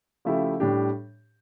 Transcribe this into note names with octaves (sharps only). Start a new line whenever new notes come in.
C#3 F3 A3 E4 G4
A2 G3 D4 G4